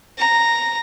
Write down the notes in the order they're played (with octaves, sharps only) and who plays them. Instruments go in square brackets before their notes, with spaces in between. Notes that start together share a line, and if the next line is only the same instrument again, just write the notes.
[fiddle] A#5